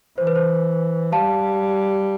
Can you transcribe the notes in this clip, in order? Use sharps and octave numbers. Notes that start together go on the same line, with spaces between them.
E3 C5
B4
C5
G3 F5 A5